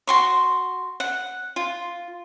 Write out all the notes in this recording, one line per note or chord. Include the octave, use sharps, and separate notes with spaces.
F#4 C6 C#6
F#5
F4